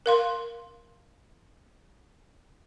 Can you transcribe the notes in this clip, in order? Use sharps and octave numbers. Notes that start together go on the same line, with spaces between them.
A#4 F5 C6